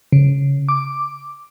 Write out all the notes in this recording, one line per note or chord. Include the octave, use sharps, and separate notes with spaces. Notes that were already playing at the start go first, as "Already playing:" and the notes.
C#3
D6